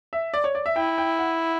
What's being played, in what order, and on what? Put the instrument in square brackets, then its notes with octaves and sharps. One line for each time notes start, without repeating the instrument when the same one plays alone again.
[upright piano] E5
D5
C#5
D5
E5
[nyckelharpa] E4 [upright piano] G5
[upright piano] G5
F#5